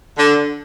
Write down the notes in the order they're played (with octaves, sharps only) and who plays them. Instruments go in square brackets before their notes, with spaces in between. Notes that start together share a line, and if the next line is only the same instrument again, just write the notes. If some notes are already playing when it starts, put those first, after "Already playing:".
[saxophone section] D3